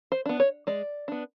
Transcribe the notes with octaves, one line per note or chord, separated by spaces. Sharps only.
C5
B3 D4
C#5
G#3 D5
B3 D4